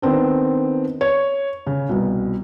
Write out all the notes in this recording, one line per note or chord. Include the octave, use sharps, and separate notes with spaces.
D#3 B3 C4 D4
C#5
C#3
C2 B2